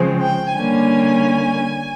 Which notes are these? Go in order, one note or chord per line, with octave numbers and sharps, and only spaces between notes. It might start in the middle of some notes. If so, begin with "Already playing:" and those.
Already playing: C#3 F3 G#3 C4
G5
D3 G3 A#3 C#4 G#5